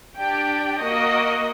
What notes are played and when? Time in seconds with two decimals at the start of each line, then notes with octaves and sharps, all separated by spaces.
0.19 D4 G4 D5 G5
0.82 A#3 F#4 A#4 D#5